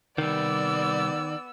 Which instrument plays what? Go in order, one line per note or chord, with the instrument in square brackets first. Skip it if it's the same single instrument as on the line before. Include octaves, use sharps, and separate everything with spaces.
[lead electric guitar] C3 G3 [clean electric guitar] D#3 [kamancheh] B3 E6 [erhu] D5